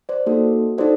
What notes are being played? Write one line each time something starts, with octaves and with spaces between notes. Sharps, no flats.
C5 D5
A#3 D#4 F#4 A4
D#4 F#4 A4 C5 D5